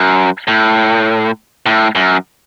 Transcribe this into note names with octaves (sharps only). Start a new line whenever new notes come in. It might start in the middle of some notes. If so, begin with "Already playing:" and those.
Already playing: F#2
A2
A2
F#2